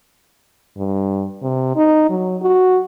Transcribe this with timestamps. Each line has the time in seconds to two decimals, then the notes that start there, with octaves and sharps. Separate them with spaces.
0.77 G2
1.42 C3
1.76 D#4
2.10 F#3
2.42 F#4